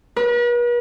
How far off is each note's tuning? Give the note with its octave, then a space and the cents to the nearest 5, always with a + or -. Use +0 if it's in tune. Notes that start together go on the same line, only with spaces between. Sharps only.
B4 -45